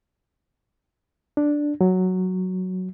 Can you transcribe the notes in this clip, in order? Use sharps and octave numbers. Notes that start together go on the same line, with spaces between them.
D4
F#3